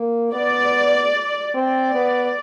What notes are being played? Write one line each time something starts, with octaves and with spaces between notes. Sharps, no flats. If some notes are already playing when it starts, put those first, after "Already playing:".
Already playing: A#3
B3 D5
C4 D5
B3